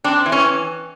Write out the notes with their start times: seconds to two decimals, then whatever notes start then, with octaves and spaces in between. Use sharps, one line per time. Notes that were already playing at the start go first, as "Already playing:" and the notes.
0.04 C4 D4
0.26 E3
0.32 C#4